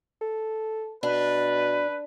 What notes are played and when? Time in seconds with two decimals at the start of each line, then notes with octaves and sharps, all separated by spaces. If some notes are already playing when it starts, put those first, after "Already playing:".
0.21 A4
1.03 B2 D4 B4